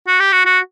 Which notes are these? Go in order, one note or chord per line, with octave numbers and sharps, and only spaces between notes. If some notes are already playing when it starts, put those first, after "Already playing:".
F#4
G4
F#4
F#4